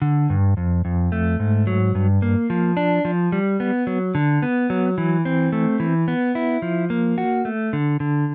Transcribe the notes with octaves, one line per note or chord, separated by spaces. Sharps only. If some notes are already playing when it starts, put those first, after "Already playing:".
D3
G2
F2
F2
A3
G#2
F#3
G2
A#3
F3
D4
F3
G3
B3
F#3
D3
B3
F#3
E3
C4
A3
E3
B3
E4
F3
A#3
F#4
A3
D3
D3